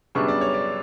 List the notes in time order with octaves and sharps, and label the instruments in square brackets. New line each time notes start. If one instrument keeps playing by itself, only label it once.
[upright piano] F#2 C#3 G3 B3 D4 C#6
D5
C#5
D5